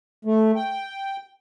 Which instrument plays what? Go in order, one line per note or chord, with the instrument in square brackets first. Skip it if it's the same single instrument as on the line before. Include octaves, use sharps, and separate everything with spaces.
[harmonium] A3
G5